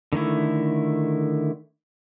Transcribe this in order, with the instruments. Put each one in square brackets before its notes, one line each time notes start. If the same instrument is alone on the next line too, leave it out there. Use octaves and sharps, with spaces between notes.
[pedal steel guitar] D3 D#3 A3 E4